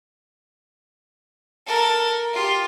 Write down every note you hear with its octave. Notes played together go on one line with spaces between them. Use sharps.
A4 A#4
F4 G4